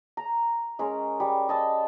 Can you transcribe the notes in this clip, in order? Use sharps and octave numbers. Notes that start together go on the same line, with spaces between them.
A#5
G#3 C#4 A#4
G3
D#5 A5 E6